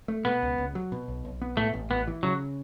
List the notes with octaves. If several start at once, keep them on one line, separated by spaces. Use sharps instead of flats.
A3
B2 B3
C#2
C#2
F#3
B2
B1
B1
B3
A2 A3
A1
A1 B3
E3
C#3 F#3